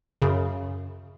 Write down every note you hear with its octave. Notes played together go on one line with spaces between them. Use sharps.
F#2 C#3